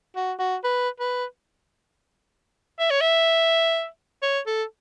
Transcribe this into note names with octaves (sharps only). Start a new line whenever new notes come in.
F#4
F#4
B4
B4
E5
C#5
E5
C#5
A4